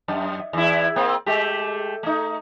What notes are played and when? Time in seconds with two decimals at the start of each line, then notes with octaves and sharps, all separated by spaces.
0.08 F#2
0.53 E2 E4
0.96 A#3 C4
1.26 G#3 A3 G4
2.03 A3 D#4